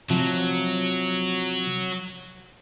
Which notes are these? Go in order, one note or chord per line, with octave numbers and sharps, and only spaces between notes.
C3 F3 F#3